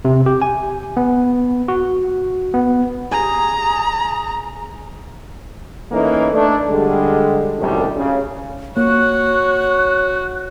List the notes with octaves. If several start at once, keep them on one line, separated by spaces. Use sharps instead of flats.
C3
G4
G#5
B3
F#4
B3
G#4 A#5
E3 A3 A#3 C#4 D#4
A3 D4
D3 G3 G#3
C2 F#2 A2 D3 D#3 G3
C#3
A#3 F#4 C#5 F#6